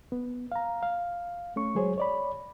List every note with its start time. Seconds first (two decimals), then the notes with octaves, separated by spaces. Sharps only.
0.12 B3
0.52 F5 A#5
0.83 F5
1.56 A3 C#4 C#6
1.75 F#3 G#3 G#4 C5 C#5
1.98 C#5 D5 B5